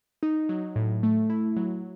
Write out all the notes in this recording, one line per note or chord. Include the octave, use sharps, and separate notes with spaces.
D#4
F#3
A2
A3
E4
F#3